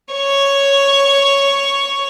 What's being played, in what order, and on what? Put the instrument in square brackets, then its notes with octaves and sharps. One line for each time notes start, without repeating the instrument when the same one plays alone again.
[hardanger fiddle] C#5 C#6